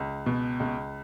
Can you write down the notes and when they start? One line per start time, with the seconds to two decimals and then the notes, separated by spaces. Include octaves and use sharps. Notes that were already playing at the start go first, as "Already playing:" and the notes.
Already playing: C#2
0.26 B2
0.60 C#2